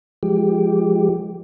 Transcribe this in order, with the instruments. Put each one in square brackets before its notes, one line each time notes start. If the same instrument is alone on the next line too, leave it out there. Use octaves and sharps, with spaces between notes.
[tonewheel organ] F3 G#3 G4